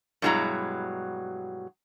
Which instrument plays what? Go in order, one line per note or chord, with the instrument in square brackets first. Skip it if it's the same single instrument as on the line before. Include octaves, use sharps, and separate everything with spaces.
[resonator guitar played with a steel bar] G2 B2 F#3 G#3 E4 A#5